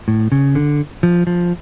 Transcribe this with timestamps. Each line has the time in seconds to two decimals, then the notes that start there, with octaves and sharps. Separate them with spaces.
0.08 A2
0.32 C#3
0.55 D3
1.03 F3
1.27 F3